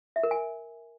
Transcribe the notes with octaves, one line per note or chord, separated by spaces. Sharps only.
E5
A#4
G#5